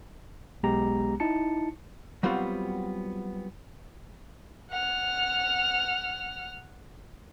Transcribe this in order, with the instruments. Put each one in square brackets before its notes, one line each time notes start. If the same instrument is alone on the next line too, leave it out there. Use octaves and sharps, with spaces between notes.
[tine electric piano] B1 G#3 B3 G4 A#5
D#4 E4 A5 C#7
[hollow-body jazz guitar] F#3 G3 B3 C4 F4 F#4
[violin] F#5 F6